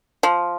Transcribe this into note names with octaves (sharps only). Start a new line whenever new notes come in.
F3